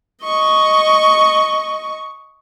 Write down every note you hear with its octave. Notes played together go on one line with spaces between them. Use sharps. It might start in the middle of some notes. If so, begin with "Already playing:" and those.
D#5 C#6